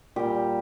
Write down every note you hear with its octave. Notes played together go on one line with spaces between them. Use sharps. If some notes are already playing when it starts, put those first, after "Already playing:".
A#2 G3 G4